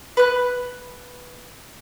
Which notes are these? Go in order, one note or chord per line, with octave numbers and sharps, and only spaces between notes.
B4 F#6